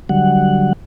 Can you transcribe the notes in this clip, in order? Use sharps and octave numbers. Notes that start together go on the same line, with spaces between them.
D3 F#3 G3 F#5